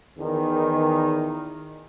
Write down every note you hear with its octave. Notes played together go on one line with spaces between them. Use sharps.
E2 D#3